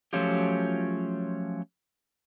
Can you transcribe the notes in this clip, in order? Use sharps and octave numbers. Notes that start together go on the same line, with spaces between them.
F3 F#3 A3 C#4 F4 G4